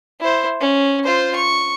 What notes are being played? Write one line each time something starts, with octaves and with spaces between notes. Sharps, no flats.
E4 C5
C#4
F4 C5
C#6